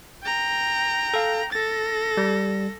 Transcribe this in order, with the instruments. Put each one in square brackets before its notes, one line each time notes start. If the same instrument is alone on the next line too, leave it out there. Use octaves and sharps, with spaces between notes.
[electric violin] G5 A#5
[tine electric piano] A4 F5
[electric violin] A4 A#6 [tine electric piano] A6
[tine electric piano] G3